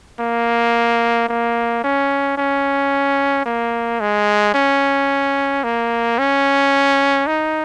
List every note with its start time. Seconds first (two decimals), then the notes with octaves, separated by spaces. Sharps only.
0.20 A#3
1.29 A#3
1.84 C#4
2.38 C#4
3.46 A#3
4.00 G#3
4.54 C#4
5.64 A#3
6.18 C#4
7.27 D#4